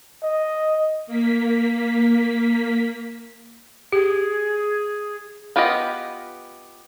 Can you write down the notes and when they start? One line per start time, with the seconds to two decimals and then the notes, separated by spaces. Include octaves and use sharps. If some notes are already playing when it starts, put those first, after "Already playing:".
0.22 D#5
1.07 A#3 B6
3.92 G4 G#4
5.56 B3 F4 G4 B4 D#5